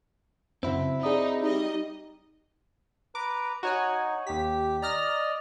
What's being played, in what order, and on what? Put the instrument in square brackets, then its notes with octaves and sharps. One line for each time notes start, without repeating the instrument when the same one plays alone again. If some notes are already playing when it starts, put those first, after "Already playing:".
[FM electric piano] F#2 C#3 [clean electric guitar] C4 E4 F#4
[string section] D#4 [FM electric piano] G#4 D5 D#6
[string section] G3 D#5 [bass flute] D#4
[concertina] B4 A#5 [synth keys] D6
[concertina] D#4 [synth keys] F#4 C#5 G#5
[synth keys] D#2 B6 [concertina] G4
[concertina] D5 D#5 [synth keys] A#5 F6 A#6